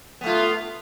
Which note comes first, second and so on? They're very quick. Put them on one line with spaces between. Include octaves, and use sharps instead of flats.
B3 A3 F4